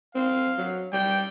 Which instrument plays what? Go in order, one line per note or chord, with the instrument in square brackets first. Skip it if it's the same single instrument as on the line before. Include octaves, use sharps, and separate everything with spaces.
[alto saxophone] C4 [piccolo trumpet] F5
[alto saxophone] F#3
[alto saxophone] G3 [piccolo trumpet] G5